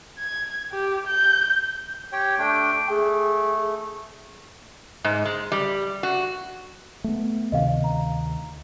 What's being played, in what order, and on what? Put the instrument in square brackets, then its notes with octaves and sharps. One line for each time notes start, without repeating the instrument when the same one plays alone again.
[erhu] G#6
G4
G6
[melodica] G4 C#5 G5
[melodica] A3 D4 [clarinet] G5
[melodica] A3 [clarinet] G#4
[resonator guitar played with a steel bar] G#2
G#3
G3
F#4
[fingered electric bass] A3 B3
[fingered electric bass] D2 C3 D#3 [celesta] D#5 F5
[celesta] A#5